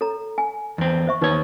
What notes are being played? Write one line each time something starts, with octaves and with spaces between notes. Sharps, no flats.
A4 C#5 A#5
G#5
E2 C4
C5 E5 C#6
D#2 D#4 B4 C#5